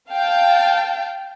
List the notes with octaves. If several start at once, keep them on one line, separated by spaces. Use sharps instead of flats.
F5 G5 A5